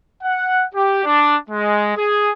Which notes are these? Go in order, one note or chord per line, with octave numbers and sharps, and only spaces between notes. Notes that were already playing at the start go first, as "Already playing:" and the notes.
F#5
G4
D4
G#3
G#4